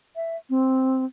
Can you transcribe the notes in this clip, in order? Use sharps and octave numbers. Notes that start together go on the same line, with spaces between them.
E5
C4